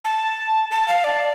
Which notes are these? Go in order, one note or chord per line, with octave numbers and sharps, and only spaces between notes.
A5
A5
F5
D5